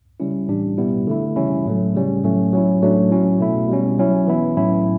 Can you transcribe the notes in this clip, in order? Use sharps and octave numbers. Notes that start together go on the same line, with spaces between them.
C#3 G3 C#4 E4
A2 E3 G3 D4
B2 G3 B3 E4
D3 A3 E4
C#3 E3 G3 C#4 E4
A2 F#3 A3
C#3 G3 C#4
A2 F#3 A3 C#4
F#3 C#4 E4
A2 F#3 A3 D4
F#3 C#4 E4
B2 A3 E4
B2 G3 C#4
F#3 C#4 E4
E3 B3 E4
A2 F#3 C#4 E4